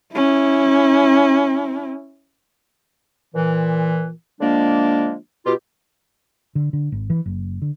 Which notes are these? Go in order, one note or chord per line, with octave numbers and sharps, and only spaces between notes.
C#4 E4
A#2 E3
D3 F3 G#3 A#3 D4
B2 F4 G4
D3
D3
G#1
E3
F#1
D3